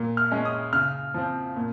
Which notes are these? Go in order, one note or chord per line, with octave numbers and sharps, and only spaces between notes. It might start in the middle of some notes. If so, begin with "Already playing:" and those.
Already playing: A#2
F6
G#3 C#4
D#6
C#3 F6
F3 C4
A#2